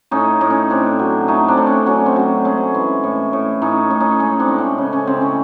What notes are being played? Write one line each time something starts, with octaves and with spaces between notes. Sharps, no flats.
A2 C#4 D#4
A2
C#4
A2 C4 D4
F#3
A3 C#4 D#4
C4 D4
A2
C#4
F#3 C#4
C4
F#3
G#3 C#4
E3
A2
A2
A2 C#4 D#4
A2
C#4 D#4
G#3 C#4 D#4
C4 D4
A2
C#4
C#3
C#4
C#3 C4
C#4